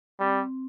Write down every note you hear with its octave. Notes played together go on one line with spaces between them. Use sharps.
G3 C4